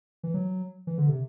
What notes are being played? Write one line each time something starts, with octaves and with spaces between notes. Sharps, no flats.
E3
F#3
E3
D3
C3